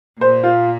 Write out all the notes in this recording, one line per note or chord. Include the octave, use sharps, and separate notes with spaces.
A#2 C5
F4